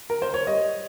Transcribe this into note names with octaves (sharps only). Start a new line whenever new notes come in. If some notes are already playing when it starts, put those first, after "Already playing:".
A#4
C5
C#5
G3 D#5